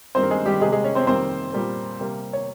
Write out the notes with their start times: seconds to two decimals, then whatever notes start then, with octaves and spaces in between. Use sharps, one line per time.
0.15 G2 D#3 G3 A#3 C4 C5
0.23 A#4
0.31 G#3 G#4
0.45 G3 G4
0.61 C3 G3 G#3 A#3 G#4
0.72 G#3 G#4
0.84 C#4 C#5
0.95 C4 C5
1.07 F2 D#3 G3 A#3 C4 C5
1.53 A#2 G3 A#3
1.99 C3 G3 A#3
2.33 C#5